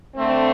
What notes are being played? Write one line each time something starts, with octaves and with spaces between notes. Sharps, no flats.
D3 A3 C4